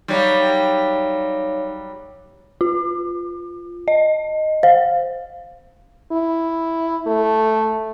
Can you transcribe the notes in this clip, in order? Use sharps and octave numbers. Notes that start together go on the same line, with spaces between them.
F#3 G3 D#4 C#5 F5
F4
D#5
C5 F5
E4
A3